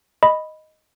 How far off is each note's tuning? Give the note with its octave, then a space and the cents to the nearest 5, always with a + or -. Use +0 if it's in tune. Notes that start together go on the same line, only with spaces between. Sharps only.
D#5 +0 B5 +0